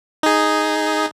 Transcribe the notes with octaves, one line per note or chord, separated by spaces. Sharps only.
D#4 G#4